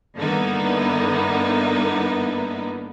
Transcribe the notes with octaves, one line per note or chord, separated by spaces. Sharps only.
G2 D3 A#3 B3 D#4 E4